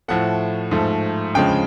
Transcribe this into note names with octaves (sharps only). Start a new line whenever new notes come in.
A2 F3 A3 F#5
G#2 F3 A3
D2 C#3 F3 G#3 G5